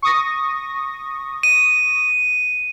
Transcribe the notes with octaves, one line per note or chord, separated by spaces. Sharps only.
C#6 D#6 A#6
D#7